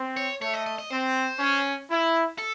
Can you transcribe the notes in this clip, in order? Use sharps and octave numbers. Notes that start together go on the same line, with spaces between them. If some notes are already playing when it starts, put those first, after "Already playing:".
Already playing: C4
C#5
A3 C#5
D#5
D#5
D#5
C4 C5
C#4
E4
A4